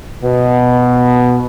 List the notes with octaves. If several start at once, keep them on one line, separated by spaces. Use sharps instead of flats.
B2